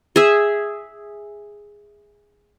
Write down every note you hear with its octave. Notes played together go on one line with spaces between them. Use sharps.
G#4 E5